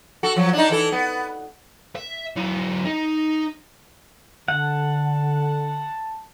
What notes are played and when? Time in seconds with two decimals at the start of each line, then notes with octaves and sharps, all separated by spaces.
0.23 F#4 A4
0.36 F3 F#3
0.53 D4 D#4
0.70 E3 E4 A4
0.92 B3
1.95 E5
2.36 F#3 E4
2.85 D#4
4.48 D3 F#5 A5